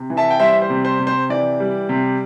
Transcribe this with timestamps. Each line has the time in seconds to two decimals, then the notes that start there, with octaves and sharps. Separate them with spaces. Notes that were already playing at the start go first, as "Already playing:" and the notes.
Already playing: C3
0.10 E3
0.17 E5 A5
0.31 G5
0.39 G3 C5 E5
0.62 C5
0.70 C3
0.85 C5
1.00 C3
1.07 C5
1.29 E3 D5
1.60 G3
1.89 C3